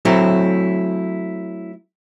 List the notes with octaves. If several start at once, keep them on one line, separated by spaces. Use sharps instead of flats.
F#3 A3 C4 E4